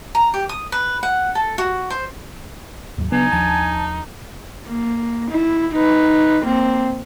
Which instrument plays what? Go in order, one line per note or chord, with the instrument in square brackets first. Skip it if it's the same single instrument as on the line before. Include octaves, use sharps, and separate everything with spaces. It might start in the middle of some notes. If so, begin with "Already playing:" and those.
[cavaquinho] A#5
G4
D#6
B4
F#5
A4
F#4
C5
[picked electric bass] D#2 G#2 F#3
[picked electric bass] C#3 F#3 D4 [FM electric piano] B3 [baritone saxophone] D#4 [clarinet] G#5
[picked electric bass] D#2 F3 D4 [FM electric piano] A5
[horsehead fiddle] A#3
E4
D#4 B4
A#3 C4